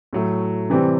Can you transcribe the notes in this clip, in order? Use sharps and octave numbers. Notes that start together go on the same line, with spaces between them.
A2 F#3 A3
C3 E3 G3 C4